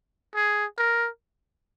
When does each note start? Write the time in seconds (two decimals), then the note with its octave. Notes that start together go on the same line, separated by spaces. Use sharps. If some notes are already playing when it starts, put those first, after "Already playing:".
0.35 G#4
0.78 A#4